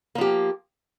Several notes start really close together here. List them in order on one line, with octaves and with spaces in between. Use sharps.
A#3 F3 G4